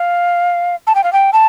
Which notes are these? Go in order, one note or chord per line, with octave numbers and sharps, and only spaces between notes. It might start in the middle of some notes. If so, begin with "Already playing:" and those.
Already playing: F5
A5
G5
F5
G5
A5